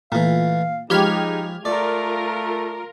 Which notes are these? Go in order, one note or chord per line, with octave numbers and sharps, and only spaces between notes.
A#2 E3 A3 F5
F3 G#3 D#4 G4 C#5 B5 F6 G#6
A3 F4 A#4 D5